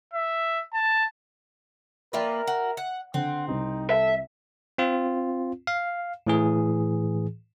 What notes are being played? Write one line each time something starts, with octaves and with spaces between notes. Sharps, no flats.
E5
A5
A#3 F4 A#4 B4 D5 E5 G5
F#4
F#5
D3 C4 F#5
C2 C3 D#4
A4 E5
C4 F4
F5
A2 E3 G#4